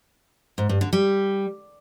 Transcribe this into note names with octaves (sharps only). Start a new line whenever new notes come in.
G#2
G2
D3
G3